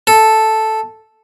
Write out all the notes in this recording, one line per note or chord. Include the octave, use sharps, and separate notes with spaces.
A4